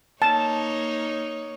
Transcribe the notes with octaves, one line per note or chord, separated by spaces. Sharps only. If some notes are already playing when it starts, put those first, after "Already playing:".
A#3 D#4 C#5 A5